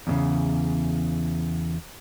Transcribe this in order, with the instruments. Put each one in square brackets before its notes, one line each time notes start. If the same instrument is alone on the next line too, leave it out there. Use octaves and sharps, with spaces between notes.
[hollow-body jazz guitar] E2 A#2 C#3